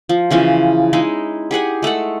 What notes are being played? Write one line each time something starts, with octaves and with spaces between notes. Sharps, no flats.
F3
C#3 E3 F3 C#4
G#3 D#4 E4
G4 G#4 F#5 G#5
G#3 A3 A4 F#5